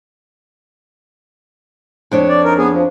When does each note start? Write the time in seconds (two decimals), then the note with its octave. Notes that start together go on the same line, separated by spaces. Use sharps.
2.11 F2 D4 C#5
2.29 D5
2.45 D#4 A#4
2.58 B3 G#4
2.72 F3